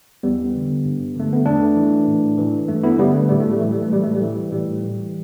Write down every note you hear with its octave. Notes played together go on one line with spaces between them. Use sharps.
E2 G3 B3
D3
G2
D3 A3
B3
E2 A3 D4
E3
A2
E3
G2 A3
B3 E4
D3 G3 B3
A3
A2 G3
A3
G3
E3 A3
G3
A3
A2 G3
A3
G3
E3
A2 G3
E3